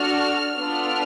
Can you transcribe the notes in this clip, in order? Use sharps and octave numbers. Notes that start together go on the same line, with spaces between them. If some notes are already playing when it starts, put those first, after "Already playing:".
Already playing: D4 F#4 A4 F6
B3 D4 F4 A4 F6